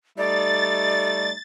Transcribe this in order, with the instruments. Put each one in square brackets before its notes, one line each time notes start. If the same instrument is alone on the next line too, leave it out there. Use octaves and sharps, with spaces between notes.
[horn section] G3 A3 D#4 [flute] D5 [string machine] A6